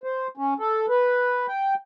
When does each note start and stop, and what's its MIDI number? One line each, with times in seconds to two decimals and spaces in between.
0.04 0.27 72
0.37 0.54 61
0.59 0.86 69
0.89 1.46 71
1.48 1.74 79